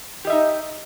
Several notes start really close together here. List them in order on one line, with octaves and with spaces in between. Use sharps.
G4 D#5 E5 D#4